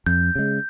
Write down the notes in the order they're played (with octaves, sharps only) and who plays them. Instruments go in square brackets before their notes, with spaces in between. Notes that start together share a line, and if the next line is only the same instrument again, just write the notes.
[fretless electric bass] F2 [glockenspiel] G6
[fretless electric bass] C#3 G#3